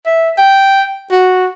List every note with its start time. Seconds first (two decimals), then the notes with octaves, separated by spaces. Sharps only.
0.06 E5
0.38 G5
1.11 F#4